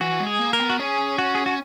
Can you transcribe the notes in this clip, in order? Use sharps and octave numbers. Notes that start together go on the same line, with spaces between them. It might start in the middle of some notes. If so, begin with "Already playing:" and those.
E3 F#4
G#3
G#4
A#3
A#4
B3
F#4
C#4 G#4
F#4
G#4
F#4